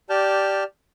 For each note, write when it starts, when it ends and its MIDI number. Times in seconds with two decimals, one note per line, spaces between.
0.10 0.64 67
0.10 0.64 74
0.10 0.64 81
0.10 0.64 89
0.10 0.64 91